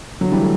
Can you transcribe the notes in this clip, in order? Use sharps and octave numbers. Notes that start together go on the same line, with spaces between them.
D3 F#3
E3 G3
A3